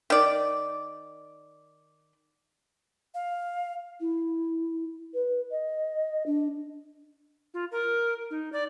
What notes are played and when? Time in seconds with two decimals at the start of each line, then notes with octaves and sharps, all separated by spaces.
0.10 D#3 D5
3.14 F5
4.00 E4
5.13 B4
5.50 D#5
6.26 D4
7.54 F4
7.72 A#4
8.31 D#4
8.53 D5